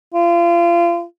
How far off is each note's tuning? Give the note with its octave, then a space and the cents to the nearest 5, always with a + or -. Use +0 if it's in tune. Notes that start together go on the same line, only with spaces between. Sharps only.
F4 -30